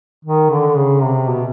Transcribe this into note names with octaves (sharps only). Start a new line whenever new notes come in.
D#3
D3
C#3
C3
B2